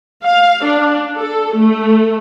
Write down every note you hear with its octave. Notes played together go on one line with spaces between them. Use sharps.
F5
D4
A4
A3